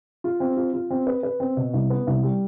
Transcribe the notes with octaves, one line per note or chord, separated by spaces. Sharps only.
F4
C4
F4
F4
C4
B4
B4
C4
B2
C2
B3
C2
G3